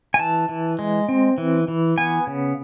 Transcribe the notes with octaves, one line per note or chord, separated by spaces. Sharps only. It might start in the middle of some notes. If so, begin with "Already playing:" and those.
G#5
E3 A5
E3
G#3
C4
E3
E3
B3 G#5
C#3